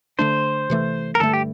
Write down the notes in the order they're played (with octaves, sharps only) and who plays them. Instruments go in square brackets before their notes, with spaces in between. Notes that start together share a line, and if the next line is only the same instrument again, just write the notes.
[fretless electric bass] D3 A3 D4 [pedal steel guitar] C5
[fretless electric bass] C3 E3 A3
[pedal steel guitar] A#4
[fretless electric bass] G2 D3 A3 [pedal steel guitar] A4
[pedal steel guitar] G4